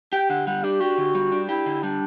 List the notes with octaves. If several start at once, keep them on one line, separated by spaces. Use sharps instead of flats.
G4 G5
D3 F#5
G3 F#5
D4 G4
F#4 G4
D3
G3
D4
E4 G4
D3
G3 D4